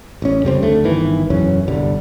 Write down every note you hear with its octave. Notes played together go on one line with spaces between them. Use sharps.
A1 C#4
F2 C#3 G3 C4
D2 D3 A3
G1 D#3 E3
E1 F#2 E3 C#4
G1 C2 D3 G3